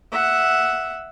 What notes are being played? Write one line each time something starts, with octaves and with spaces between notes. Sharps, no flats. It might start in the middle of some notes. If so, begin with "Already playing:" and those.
E5 F#5